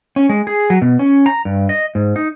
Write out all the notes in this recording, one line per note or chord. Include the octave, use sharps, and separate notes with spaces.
C#4
G#3
G#4
F#3
B2
C#4
A#5
G2
D#5
G#2
D#4